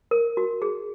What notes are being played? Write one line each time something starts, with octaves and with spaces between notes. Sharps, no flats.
A#4
F#4
G#4